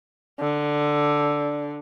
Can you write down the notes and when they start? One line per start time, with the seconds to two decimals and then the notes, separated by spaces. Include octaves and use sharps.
0.40 D3